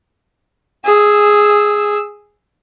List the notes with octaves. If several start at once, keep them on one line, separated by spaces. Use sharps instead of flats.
G#4 E6